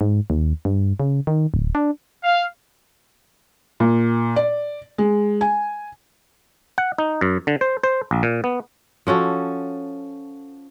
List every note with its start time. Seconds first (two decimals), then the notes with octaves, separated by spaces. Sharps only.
0.01 G#2
0.30 D#2
0.65 G2
1.00 C#3
1.27 D#3
1.54 D1
1.75 D4
2.24 F5
3.80 A#2
4.36 D5
4.98 G#3
5.41 G#5
6.78 F#5
6.98 D#4
7.21 F#2
7.47 D3
7.61 C5
7.83 C5
8.11 A#1
8.23 A#2
8.44 B3
9.07 F3 C#4 F#4 A4